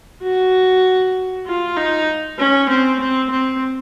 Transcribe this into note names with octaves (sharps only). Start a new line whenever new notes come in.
F#4
F4
D#4
C#4
C4
C4
C4